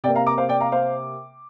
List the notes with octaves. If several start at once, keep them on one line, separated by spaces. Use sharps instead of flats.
C3 A#3 D5 G5
F5 A#5
A#5 D6
C5 F5
D5 G5
F5 A#5
C5 F5